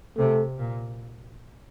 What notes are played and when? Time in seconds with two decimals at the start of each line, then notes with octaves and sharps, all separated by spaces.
0.17 C3 A3
0.59 A#2